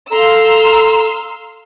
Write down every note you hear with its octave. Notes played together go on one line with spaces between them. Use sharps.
A4 F5 A#5 C6 E6